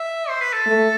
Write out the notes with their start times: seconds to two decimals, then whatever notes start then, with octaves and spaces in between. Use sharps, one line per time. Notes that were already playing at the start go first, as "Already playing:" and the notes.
Already playing: E5
0.29 C5
0.41 B4
0.53 A4
0.66 A3